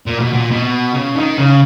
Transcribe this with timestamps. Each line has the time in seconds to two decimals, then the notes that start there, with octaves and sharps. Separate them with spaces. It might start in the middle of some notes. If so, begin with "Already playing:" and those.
0.06 A#2
0.20 B2
0.33 A#2
0.51 B2
0.94 C#3
1.15 D#3
1.38 C#3